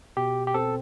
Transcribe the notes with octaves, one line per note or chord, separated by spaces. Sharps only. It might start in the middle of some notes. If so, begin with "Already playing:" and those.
B2 G4
G4
C4 A4